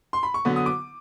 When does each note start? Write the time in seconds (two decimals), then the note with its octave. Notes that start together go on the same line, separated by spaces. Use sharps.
0.13 C6
0.23 B5
0.34 C#6
0.45 D3 F#3 B3
0.56 D#6
0.66 D6